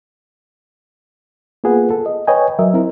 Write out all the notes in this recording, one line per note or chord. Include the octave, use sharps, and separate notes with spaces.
A#3 B3 F4 G#4 B4 F#5
A4
D#5
B4 C#5 D#5 G5 G#5
F#3 A#4 D#5 E5
C4 E4 A#4